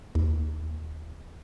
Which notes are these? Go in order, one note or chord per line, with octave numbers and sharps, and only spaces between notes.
D#2